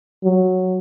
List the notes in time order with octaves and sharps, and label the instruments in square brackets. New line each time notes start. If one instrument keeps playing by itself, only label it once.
[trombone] F#3